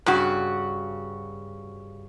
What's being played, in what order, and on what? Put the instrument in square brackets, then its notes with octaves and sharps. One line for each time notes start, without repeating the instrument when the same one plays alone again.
[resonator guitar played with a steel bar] G2 C#3 F#4